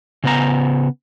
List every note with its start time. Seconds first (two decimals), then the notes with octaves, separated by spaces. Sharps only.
0.24 C#3 B3 A#5